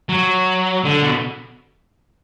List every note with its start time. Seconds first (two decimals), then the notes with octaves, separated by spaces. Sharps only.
0.09 F#3
0.85 D3
1.03 B2